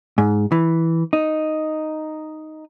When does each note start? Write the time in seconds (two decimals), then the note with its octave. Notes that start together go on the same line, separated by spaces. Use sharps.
0.18 G#2
0.52 E3
1.13 D#4